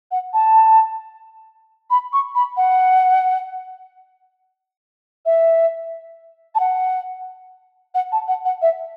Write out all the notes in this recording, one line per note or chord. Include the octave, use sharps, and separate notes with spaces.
F#5
A5
B5
C#6
B5
F#5
E5
A5
F#5
F#5
A5
F#5
F#5
E5